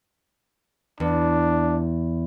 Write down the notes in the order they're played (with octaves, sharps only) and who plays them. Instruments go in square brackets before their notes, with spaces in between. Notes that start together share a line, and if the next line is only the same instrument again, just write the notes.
[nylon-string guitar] E2 [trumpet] D4